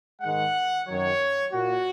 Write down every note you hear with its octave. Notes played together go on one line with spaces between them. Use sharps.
G#2 D#3 G#3 F#5
F#2 D#3 F#3 C#5
A#2 A#3 F#4